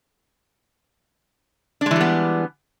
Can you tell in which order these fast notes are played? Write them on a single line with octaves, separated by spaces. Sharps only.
D4 G#3 E3 G3 B3